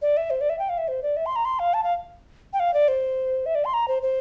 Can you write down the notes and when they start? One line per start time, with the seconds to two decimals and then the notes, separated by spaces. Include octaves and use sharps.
0.02 D5
0.17 E5
0.30 C5
0.41 D5
0.49 E5
0.59 G5
0.69 F5
0.78 E5
0.88 C5
1.03 D5
1.16 E5
1.26 C6
1.36 A#5
1.45 C6
1.59 F5
1.74 A5
1.83 F5
2.53 G5
2.60 F5
2.74 D5
2.88 C5
3.46 E5
3.55 D5
3.65 C6
3.74 A#5
3.88 C5
4.02 C5